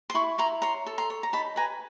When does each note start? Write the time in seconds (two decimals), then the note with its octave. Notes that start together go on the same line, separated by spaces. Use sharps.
0.10 C6
0.14 E4 B5 C#6
0.38 E4 A#5 C6
0.62 C#5 A#5 C6
0.86 A4
0.98 A#5 C6
1.10 C#5
1.23 A#5
1.33 D#4 A5 B5
1.56 B4 G#5 A#5